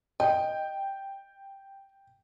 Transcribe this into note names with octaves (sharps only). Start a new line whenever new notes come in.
D#5 G5